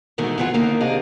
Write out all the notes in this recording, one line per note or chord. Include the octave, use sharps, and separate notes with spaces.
G#2 B2 D#3 E3 A3 F#4
E2 A#2 E3 F4 F#5
D#2 D3 D#3 A3 A#3 A#5
C3 D4 G#4 D#5 F5